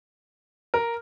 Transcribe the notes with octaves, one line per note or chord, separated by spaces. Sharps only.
A#4